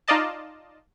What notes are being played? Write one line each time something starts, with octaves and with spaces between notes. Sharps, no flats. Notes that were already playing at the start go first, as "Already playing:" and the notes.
D#4 F4 D5 D#5 A5